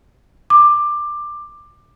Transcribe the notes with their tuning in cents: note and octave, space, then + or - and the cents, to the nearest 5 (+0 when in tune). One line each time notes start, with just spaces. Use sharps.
D6 +15